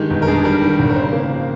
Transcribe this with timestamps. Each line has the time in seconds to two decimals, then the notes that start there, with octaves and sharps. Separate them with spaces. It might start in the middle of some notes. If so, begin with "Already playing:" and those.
Already playing: G2 D#3 G#3 G4
0.10 G1
0.22 A#4
0.27 G2 G#4
0.44 G3 A#4
0.62 D#3
0.79 G#1
0.90 A#4
0.96 C#3 C5
1.13 A#3
1.30 F3